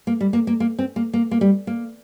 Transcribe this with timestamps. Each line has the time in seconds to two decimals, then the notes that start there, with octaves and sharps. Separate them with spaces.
0.07 A#3
0.20 G3
0.33 A#3
0.47 A#3
0.60 A#3
0.79 C4
0.96 A#3
1.13 A#3
1.31 A#3
1.41 G3
1.67 A#3